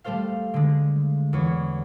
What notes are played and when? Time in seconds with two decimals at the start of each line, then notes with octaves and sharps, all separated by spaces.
0.04 G3 A3 A4 C5 F5
0.54 D3 G#3
1.33 E2 C#5